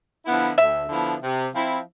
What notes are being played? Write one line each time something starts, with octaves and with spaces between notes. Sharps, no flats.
D3 F3 B3 E4
D2 E5
D3 F3 B3 E4
C3
F3 C4 E4